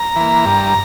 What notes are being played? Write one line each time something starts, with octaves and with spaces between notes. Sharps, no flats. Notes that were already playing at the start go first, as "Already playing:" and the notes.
Already playing: A#5
E3 A#3
G2